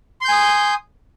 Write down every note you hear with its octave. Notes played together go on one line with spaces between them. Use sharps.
G#5 C6 D#6 G6